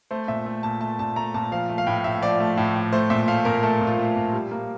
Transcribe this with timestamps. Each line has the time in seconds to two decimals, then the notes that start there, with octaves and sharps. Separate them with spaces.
0.11 A3 C5
0.28 A#2 E5
0.46 A3
0.63 A#2 A5
0.81 A3 A5
0.99 A#2 A5
1.16 A3 A#5
1.34 A#2 A5
1.52 F3 F5
1.69 A3
1.78 F5
1.87 A2 G5
2.04 A2 E5
2.22 F3 D5
2.40 A3
2.57 A2
2.76 A2
2.92 A3 C5
3.10 A#2 E5
3.28 A3 F5
3.45 A#2 A#4
3.63 A3 A4
3.81 A#2
3.87 F4
3.98 A3
4.16 A#2
4.33 G3
4.51 A#3